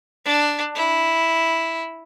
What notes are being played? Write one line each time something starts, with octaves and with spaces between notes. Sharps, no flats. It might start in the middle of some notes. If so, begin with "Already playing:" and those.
D4
E4